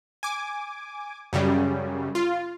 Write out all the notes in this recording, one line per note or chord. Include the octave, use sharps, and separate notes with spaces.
G#5 D6
F#2 C#3 G3
F4